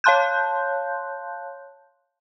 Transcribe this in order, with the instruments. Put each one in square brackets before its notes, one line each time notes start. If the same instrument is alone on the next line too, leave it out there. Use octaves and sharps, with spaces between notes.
[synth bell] C#5 F5 A5 C6 F#6 G6